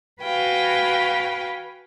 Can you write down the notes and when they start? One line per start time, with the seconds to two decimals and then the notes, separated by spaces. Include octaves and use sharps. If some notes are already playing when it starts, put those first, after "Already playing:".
0.21 F#4 B4 F5 G5 G#5